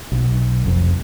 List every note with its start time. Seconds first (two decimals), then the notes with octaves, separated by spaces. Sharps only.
0.12 B1
0.64 F1 F2